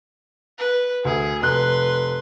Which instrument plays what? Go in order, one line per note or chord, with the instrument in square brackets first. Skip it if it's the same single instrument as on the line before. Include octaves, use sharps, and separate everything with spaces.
[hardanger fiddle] B4
[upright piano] D2 [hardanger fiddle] G#4
[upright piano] F1 F#6 [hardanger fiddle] B4 C6